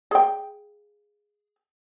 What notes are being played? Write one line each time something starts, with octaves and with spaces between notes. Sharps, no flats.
G#4 G5